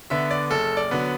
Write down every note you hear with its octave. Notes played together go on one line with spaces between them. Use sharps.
D3 B3 E5
D5
F#1 A4
D5
D3 F#3 B3